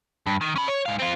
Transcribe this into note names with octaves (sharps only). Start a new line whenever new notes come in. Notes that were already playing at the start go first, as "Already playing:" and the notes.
G2
D#3
C#4 B5
C#5
G#2 F5
C4 F4